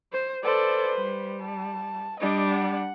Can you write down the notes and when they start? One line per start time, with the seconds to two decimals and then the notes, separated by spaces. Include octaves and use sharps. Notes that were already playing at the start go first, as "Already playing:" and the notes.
0.12 C5
0.44 A4 B4 C5 D5
0.96 G3
1.41 A5
2.20 G3 D4 D#5
2.52 F#5